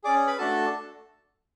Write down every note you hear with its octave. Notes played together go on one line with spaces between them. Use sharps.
C#4 G#4 D5 D6
B4 B5
A3 D4 F#4 A4 A5